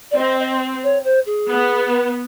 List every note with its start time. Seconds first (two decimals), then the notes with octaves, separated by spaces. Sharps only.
0.11 D5
0.17 C4 D#5
0.39 D#5
0.83 C#5
1.04 C5
1.26 G#4
1.49 B3